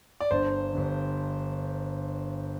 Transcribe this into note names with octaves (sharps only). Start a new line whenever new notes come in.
D5
G1 G2 D3 C5
G1 G2 D3